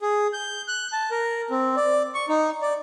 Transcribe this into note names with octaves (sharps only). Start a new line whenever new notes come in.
G#4
G6
F#6
A5
A#4
C4
D5
C#6
D#4
D5